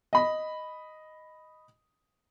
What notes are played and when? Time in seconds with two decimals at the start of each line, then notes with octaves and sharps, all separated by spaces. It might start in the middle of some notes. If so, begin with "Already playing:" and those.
0.13 D#5 B5